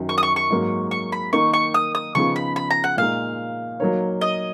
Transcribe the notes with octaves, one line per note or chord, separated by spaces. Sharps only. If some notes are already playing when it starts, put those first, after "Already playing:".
Already playing: F#2 D#3 F#3
C#6
D#6
C#6
C#6
G#2 F#3 A#3
C#6
B5
D#3 A#3 D#4 C#6
C#6
D#6
D#6
C#3 F3 B3 D#4 G#4 C#6
B5
B5
A#5
F#5
A#2 G#3 D#4 F5
F#3 A#3 D#4 A#4 C#5
D#5